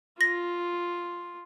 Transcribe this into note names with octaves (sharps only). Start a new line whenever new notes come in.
F4 A#6